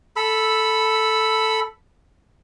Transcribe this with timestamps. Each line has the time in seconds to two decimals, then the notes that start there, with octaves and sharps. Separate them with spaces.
0.16 A4 B5 E6